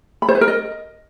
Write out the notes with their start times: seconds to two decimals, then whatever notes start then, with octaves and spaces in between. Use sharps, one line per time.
0.22 B5
0.29 C5
0.35 B4
0.41 A#4
0.48 D#5